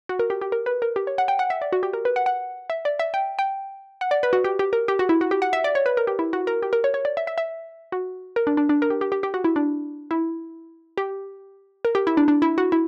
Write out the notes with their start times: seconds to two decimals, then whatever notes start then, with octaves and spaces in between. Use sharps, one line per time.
0.09 F#4
0.19 A#4
0.30 G4
0.41 G4
0.52 A#4
0.66 B4
0.82 A#4
0.96 G4
1.07 C#5
1.18 F#5
1.28 G5
1.39 F#5
1.50 E5
1.62 D5
1.73 F#4
1.83 G4
1.93 A#4
2.05 B4
2.16 F#5
2.26 F#5
2.70 E5
2.85 D5
2.99 E5
3.14 G5
3.39 G5
4.01 F#5
4.11 D5
4.23 B4
4.33 F#4
4.44 G4
4.59 G4
4.73 A#4
4.88 G4
4.99 F#4
5.09 E4
5.21 F#4
5.31 G4
5.42 F#5
5.53 E5
5.64 D5
5.75 C#5
5.86 B4
5.97 A#4
6.07 G4
6.19 E4
6.33 F#4
6.47 A#4
6.63 G4
6.73 A#4
6.84 C#5
6.94 C#5
7.05 D5
7.17 E5
7.27 E5
7.38 E5
7.92 F#4
8.36 A#4
8.47 D4
8.57 D4
8.69 D4
8.82 A#4
8.90 G4
9.01 G4
9.12 G4
9.23 G4
9.34 F#4
9.44 E4
9.56 D4
10.11 E4
10.98 G4
11.85 A#4
11.95 G4
12.07 E4
12.17 D4
12.28 D4
12.42 E4
12.58 F#4
12.72 E4